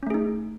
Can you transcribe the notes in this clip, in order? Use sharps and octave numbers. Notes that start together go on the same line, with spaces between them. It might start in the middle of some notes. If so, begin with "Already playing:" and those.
A3 C#4 D#4 G#4